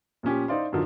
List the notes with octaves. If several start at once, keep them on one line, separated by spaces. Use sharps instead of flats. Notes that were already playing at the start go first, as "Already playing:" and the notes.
A#2 F3 C#4 G4
D#4 E4 C5 D5 F5 C6
F#2 D3 D#3 F3